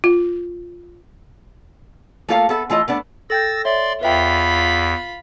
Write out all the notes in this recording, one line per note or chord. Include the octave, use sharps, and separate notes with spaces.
F4
A3 A#3 F4 A4 C5 F5
B3 A4 E5
E3 A3 F4 D#5
A3 B3 D4
A4 G5 E6 G6 A6 A#6
C#5 D5 E5 C6
E2 F4 B4 E5 G5 B5